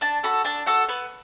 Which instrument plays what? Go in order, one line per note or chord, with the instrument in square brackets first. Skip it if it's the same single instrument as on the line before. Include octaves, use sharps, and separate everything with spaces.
[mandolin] D4 A5
F#4 A4 B5
D4 A5
F#4 A4 F#5
B3 B4